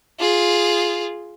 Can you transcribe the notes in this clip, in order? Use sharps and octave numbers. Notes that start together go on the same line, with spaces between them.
F4 G#4